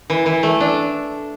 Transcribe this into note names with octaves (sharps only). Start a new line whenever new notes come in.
E3
E3
A3
D4